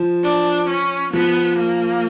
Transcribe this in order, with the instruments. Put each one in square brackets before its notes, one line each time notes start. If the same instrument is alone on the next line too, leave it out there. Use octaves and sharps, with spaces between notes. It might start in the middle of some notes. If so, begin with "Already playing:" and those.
Already playing: [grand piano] F3
[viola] D4
C#4
[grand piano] F3 [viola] B3
[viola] A#3